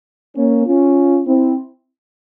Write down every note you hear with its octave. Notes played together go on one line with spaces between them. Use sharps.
A#3 C#4
C#4 F4
C4 E4